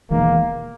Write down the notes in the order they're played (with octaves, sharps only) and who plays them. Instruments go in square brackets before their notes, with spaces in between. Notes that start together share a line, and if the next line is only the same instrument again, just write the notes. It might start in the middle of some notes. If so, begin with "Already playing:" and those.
[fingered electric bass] E1 E2 D#3 G#3 [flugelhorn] A#3